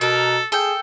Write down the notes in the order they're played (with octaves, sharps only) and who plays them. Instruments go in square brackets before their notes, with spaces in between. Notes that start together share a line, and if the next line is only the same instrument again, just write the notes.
[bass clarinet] B2 [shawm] A4 [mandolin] A#4
[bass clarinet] G#4 [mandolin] A4 G5